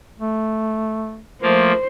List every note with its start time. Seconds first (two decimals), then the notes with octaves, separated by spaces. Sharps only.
0.20 A3
1.42 F3 A3 A#3 C5